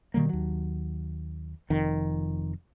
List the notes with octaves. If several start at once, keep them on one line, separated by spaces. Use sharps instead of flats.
B2 D#3 G3 A#3
D#2 F#3
F1 F2 D#3 C4